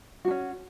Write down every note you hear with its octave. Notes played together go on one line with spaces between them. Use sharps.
C#4 D4 F#4